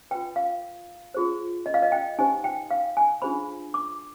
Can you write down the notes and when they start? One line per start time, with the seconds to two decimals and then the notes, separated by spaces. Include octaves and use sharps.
0.11 F4 B4 G5
0.36 F5
1.14 F4 G#4 C5
1.66 D#5
1.74 F5
1.83 D#5
1.92 G5
2.19 D#4 G4 C5 G#5
2.44 G5
2.71 F5
2.97 G#5
3.22 D4 F4 G#4 C5 B5
3.74 D6